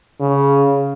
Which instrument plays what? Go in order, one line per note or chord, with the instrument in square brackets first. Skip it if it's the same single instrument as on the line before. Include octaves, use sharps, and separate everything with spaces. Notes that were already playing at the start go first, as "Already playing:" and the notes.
[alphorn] C#3